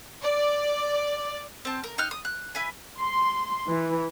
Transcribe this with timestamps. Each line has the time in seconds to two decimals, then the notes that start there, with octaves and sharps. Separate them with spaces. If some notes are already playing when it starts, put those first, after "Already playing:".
0.22 D5
1.65 C4 A5
1.84 A#4
1.98 D#4 G5 F6 F#6
2.11 D#6
2.25 F#6
2.55 E4 B4 G#5
2.99 C6
3.69 E3